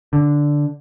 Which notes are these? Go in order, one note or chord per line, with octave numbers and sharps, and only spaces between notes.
D3